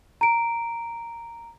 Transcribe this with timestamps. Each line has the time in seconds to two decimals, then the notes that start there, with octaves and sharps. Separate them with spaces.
0.21 A#5 D7